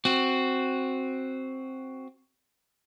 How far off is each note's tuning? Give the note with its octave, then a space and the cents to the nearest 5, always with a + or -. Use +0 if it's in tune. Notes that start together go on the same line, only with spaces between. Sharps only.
C4 +5 F#4 +5